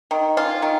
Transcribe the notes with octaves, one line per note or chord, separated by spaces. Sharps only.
D#3
C#4 F4
D#3